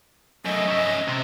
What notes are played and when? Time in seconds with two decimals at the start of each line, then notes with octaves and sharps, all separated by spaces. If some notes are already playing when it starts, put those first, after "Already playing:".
0.45 F#2 A3 D#5
0.68 C#4 E5
1.08 C3 C4